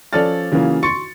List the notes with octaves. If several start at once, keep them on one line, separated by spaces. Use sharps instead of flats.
F3 C#4 A4 D5 F6 A6
C#3 E3 F#3 A#3 F4
C6 C#6 A6 C#7